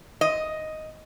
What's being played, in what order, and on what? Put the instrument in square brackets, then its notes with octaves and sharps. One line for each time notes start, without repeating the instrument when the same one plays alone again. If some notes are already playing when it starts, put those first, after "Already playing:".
[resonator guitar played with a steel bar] D#5